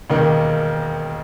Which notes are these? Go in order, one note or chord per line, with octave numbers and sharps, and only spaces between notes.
E1 D#2 D#3 A#3 D#4